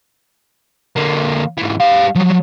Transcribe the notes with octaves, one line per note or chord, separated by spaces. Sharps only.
D3 A#3
G#2 E3
G3 F5
F3 F#3